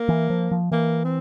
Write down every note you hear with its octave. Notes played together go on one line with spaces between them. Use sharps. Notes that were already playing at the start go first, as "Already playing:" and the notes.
Already playing: A#3
E3
F3
F3
E3 A#3
C4